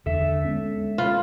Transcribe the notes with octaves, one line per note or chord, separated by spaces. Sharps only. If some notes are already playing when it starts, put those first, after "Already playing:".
E2 D3 D4 A4 E5
G#3 B3 C#4
F4 B4